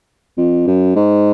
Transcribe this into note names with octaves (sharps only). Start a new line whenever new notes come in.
F2
F#2
G#2